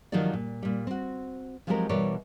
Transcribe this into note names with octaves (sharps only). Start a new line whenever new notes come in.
D#3 F3 F#3 D#4 G4 D5
A#2
A#2 G3
C4 F#4
F3 F#3 G#3 C4 G4 A#4
B2 E3 G3 A#4 C#5 D5